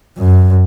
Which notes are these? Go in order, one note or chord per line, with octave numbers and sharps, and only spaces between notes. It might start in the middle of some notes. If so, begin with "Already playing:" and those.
F#2